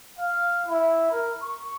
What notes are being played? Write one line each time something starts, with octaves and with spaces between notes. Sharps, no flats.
F5
E4
A#4
C#6